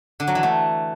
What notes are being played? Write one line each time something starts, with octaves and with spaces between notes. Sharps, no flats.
D3
F#3
E3
A3